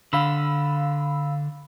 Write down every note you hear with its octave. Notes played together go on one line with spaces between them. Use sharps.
D3 F5 B5 E6